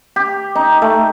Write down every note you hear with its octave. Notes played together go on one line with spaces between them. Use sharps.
G4
D#4
A3